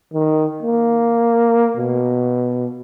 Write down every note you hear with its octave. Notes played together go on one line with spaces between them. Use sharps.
D#3
A#3
B2